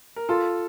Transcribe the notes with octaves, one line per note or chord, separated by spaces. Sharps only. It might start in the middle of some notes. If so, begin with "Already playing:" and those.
A#4
F4 A4